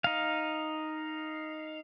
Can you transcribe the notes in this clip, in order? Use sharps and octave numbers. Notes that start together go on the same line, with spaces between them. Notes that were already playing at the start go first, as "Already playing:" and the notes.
D#4 F5